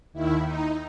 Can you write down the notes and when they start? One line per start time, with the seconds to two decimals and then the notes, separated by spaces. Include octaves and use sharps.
0.13 D#2 D#3 E4
0.44 D#4